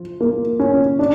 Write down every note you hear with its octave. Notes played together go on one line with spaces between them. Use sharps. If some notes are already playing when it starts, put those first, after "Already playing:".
Already playing: F3 F4
A#3
C#4
D4